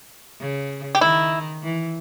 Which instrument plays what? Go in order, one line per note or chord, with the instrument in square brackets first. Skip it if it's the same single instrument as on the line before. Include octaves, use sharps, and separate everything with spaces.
[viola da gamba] C#3
[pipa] G4
[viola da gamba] D#3 [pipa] E4
[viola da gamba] E3